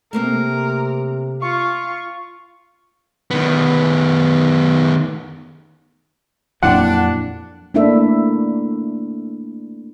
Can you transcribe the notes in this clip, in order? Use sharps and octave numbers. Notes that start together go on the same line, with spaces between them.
C3 A3 A#3 C4 A#4
F4 C#6
D#3 B3
F2 A#2 F#3 A#3 D4 E4 F#5 G5
A3 A#3 D4 E4 A4 E5